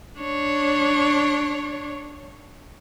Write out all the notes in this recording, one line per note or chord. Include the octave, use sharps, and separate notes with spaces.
D4 C#5